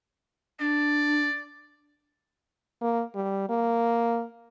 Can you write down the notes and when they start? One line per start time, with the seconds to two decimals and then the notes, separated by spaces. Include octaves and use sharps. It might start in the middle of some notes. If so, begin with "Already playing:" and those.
0.60 D4 D5
2.81 A#3
3.15 G3
3.49 A#3